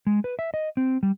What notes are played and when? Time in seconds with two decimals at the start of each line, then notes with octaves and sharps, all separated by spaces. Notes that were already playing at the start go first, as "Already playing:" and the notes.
0.07 G#3
0.24 B4
0.39 E5
0.54 D#5
0.77 C4
1.03 G3